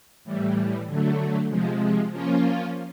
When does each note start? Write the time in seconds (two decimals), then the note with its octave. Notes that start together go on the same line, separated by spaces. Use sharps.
0.24 A2 E3 G3
0.87 D3 F#3 A3
1.49 C3 F3 G#3
2.11 F3 A#3 C#4 F4